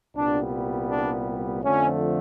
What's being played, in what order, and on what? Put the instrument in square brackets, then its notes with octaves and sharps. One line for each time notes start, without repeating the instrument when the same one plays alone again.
[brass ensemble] C2 A#2 G3 B3 D4
D4
F2 D3 F3 A3 C#4